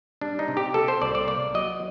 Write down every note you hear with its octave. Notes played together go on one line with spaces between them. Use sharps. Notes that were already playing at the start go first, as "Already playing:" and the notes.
G3 D4
D#4
C3
G4
A#3 A4
C5
C2 D5
D5
A#3 D5
F#3 D#5